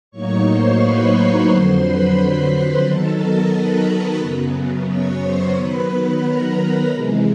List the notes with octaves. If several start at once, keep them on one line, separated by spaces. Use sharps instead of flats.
A2 F#3 A#3 D#4 C#5 C#6
C5 C6
B4 B5
B4 B5
F2 D3 F#3 C5 C6
B4 B5
D#3 F#3 B3 D#4 A4 A5
A#4 A#5
B4 B5
F#2 C#3 F#3 B3
C#5 C#6
C5 C6
D#3 F#3 B3 B4 B5
A#4 A#5
C3 E3 G#3